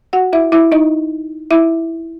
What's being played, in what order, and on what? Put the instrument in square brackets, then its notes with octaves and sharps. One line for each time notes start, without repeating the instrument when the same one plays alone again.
[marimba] F#4 F#5
E4 E5
E4 E5
D#4 D#5
E4 E5